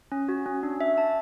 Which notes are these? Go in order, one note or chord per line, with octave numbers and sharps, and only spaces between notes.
C#4
F#4
C#4
D4
E5
A5